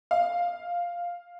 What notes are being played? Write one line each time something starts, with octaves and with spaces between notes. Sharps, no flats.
F5